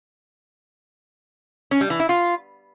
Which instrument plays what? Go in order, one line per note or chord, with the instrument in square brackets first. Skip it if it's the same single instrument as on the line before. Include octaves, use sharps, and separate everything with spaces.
[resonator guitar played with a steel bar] C#4
G3
E3
E4
F4